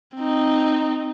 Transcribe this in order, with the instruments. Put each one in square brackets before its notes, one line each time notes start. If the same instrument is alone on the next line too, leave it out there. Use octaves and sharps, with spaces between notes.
[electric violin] C4 D#4